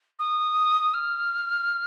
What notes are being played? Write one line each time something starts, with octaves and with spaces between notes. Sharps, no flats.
D#6
F6